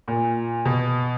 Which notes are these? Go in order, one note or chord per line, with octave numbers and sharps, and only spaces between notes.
A#2
B2